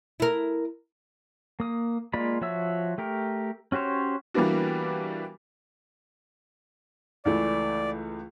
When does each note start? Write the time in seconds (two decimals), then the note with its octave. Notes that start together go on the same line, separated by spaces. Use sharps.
0.20 E4 A#4
1.60 A#3 D#6
2.13 G#3 A#3 F4 D5 B5
2.41 F3 F#4 C#5 E5 E6
2.98 A3 G4 A#4
3.72 C#4 F#4 G4 C5 C#5
4.34 E3 G3 A#3 B3 D4 F#4
7.25 C#2 E3 A3 D5